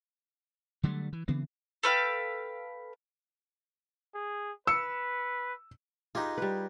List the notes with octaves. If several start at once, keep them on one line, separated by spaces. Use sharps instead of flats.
D3 F#3 G3 A3
E3
C#3 E3 B3 C4
A4 B4 F5 G5
G#4
B4 E6 C#7
D#4 F4 G4 G#4 B4 D#5
G3 B4